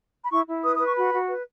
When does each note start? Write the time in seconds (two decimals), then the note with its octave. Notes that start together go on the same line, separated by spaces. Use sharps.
0.23 B5
0.30 E4 C#6
0.47 E4
0.63 B4 D#6
0.75 B4 D#6
0.86 C#6
0.96 F#4 B5
1.13 F#4
1.28 B4